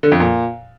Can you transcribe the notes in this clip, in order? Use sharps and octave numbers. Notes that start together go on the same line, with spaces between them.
D3
F2
A#2